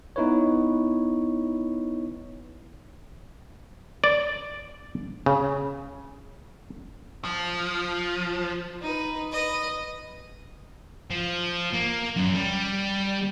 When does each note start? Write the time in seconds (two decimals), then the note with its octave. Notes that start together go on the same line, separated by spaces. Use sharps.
0.16 B3 D#4 E4 B4 C#5
4.04 D5
5.26 C#3
7.25 F3
8.81 D#4 B4
9.32 B4 D#5
11.11 F3
11.73 A#3
12.16 F#2
12.35 G3